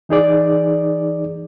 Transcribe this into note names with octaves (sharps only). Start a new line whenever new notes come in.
E3 D#4 G#4 D5